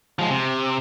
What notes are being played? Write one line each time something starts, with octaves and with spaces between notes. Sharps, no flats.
F3 G#3
C3